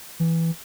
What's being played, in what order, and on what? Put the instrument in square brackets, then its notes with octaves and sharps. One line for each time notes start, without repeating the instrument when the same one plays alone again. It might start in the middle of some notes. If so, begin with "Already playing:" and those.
[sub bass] E3